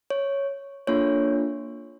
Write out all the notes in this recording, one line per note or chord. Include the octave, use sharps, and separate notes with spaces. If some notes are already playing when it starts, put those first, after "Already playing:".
C#5
A#3 D4 F4 A4 C#5